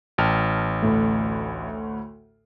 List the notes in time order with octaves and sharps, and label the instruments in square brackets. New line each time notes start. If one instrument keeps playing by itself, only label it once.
[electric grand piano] A1 [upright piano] G5 A5 F6
[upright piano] D2 A2 A3